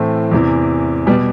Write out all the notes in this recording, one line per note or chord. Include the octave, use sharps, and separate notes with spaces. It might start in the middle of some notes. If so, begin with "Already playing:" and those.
Already playing: A2 E3 A3 C4
E2 C3 E3
B2 G3 B3